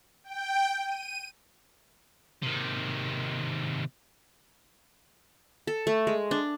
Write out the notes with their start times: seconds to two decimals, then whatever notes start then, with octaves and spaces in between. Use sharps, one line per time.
0.24 G5
0.85 D#7
2.43 C3 D#3
5.67 A4
5.87 A3
6.07 G#3
6.31 D4